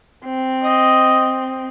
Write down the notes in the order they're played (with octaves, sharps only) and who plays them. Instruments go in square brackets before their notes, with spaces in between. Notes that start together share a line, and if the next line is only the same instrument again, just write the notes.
[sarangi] C4
[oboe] D#5